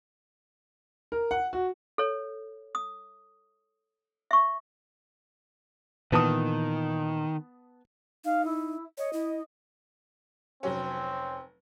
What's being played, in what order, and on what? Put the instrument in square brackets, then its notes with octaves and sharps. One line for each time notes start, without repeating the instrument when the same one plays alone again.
[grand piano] A#4
F#5
F#4
[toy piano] A4 C#5
D#6
E5 C#6
[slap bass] A#2 E3 [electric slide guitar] D#3 [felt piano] B3 A5 D#6
[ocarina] D#4 [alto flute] F5
[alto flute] E4
[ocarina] C#5 [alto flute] D#5
[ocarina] E4
[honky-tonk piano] F1 F#3 C#4 [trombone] C4